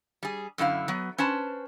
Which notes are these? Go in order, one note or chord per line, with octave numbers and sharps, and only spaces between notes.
G3 G#4
F#2 D3 E4 F4 F5
F#3 B3
C#4 B4 C5 A5